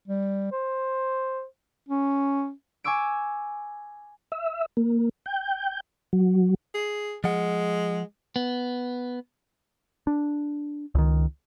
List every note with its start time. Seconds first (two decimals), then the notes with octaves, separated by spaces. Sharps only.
0.08 G3
0.52 C5
1.89 C#4
2.84 G#5 C#6 D6 E6 D7
4.32 E5
4.77 A#3
5.26 G5
6.13 F#3
6.74 G#4
7.24 F3 G#3 F#5
8.36 B3
10.07 D4
10.95 C#2 D#3